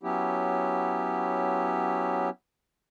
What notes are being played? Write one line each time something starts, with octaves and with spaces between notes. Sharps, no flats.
F#3 B3 C#4 E4 G4